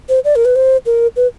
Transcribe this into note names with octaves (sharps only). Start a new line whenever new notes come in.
C5
D5
A#4
B4
C5
A#4
B4